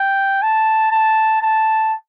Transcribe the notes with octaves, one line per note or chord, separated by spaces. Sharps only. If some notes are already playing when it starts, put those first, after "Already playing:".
Already playing: G5
A5
A5
A5